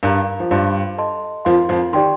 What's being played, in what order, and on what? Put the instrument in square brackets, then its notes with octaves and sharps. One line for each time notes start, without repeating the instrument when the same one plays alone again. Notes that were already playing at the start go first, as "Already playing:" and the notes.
[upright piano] G2 G3 [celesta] A#4 F5 A#5
[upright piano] F3
[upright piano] G2 G3 [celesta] F4 C5 F5 C6
[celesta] A4 D#5 A5 C6
[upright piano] F2 F3 [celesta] A#4 F5 C6
[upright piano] F2 F3
[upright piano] D#3 [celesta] G4 D5 G5 C6